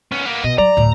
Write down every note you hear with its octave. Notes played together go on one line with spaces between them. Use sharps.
B3 C#4
A#3 B3
B2 D#5
F#3 D5 A#5
D2 A2